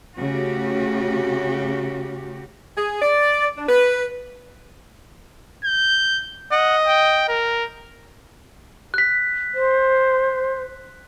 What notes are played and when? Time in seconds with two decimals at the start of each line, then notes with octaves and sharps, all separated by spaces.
0.17 C#3 A3 F#4 G4
2.77 G#4
3.01 D5
3.56 D4
3.68 B4
5.64 G6
6.52 D#5 F#5
6.87 G5
7.28 A#4
8.94 F#6 B6
9.54 C5